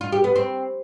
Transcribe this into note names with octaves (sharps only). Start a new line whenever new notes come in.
F4
G4
B3
C4